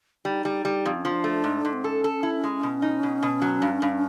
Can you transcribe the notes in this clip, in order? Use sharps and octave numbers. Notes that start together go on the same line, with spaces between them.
G3 D#4
G3
G3
F2
C#4
F3 D4
A3
G#2
G#2
C4
C#4 A4
A4
E4
G#3
B2
D#4
B2
B2
F#3
G2
G2